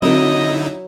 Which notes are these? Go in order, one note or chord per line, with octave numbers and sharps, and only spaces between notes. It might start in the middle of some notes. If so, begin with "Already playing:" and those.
D3 F#3 C4 D#4 E4 A#4 D#5